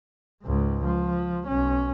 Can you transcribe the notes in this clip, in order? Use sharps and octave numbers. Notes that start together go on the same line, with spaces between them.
C#2 G#2
F3
B1 C#4